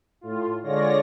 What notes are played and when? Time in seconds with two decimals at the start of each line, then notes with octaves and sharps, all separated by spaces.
0.21 A2 F4
0.62 D3 G#3 F4 C#5 D5 A#6